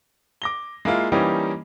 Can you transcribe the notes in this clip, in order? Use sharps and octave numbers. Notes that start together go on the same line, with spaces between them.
D6 A#6 G7
G#3 A#3 E4 F4
E3 G3 A#3 C#4 D#4 G4